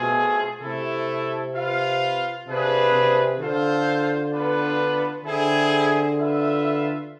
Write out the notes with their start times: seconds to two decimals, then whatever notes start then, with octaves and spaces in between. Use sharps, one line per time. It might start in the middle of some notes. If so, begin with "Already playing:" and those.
Already playing: B2 A3 C4 F4 G#4
0.62 C3 A3 E4 A4
1.54 F4 B4 F5
2.47 C3 D4 F4 G#4 B4
2.93 C3
3.39 D3 F4 A4 C5 F5
4.32 B3 D4 F4 B4
5.24 D3 C4 E4 G#4
6.17 F4 B4 E5